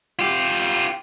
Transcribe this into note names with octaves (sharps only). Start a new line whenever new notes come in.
F4 G4